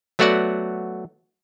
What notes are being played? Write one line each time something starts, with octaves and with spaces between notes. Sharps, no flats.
F#3 A3 B3 F#4 D5 F#5